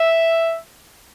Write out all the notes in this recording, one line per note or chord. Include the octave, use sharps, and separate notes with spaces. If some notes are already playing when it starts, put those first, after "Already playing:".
Already playing: E5